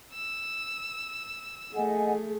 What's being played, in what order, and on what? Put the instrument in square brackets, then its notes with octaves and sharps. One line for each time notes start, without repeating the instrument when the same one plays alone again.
[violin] E6
[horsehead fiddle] A3 G#4 [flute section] D#5 F#5 G#5